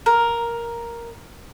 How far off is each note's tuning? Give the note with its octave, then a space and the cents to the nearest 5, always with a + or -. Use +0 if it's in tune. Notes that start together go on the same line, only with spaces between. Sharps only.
A#4 +5